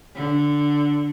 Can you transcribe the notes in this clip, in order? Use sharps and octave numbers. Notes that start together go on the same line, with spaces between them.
D3